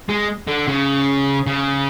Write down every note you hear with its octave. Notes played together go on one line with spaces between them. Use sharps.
G#3
D3
C#3
C#3